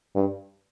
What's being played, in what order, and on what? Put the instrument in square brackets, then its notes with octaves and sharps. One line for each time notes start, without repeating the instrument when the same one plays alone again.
[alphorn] G2